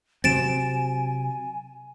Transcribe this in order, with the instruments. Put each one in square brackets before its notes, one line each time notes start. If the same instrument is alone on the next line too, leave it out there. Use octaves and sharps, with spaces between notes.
[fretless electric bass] C3 F#3 C4 [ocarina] G#5 [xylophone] A6 D7 E7